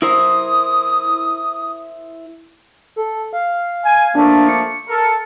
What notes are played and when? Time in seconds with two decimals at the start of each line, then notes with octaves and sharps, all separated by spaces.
0.02 E4 A#4 C5 D#6
2.96 A4
3.33 F5
3.85 G#5
4.15 F3 A3 A#3 D4
4.49 C#7
4.88 A4 A#4